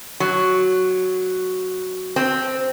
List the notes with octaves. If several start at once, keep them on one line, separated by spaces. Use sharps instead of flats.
F#3
C4